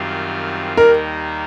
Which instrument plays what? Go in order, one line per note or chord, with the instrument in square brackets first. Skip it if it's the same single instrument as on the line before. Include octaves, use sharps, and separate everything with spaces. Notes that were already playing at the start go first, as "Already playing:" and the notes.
Already playing: [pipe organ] F#2 D#3 G3 C4 F4
[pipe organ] D#2 D#3 G3 A#3 D#4 [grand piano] A#4